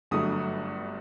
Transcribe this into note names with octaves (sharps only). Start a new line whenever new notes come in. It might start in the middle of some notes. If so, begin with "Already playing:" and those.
G1 G2 F#3 A3 D#6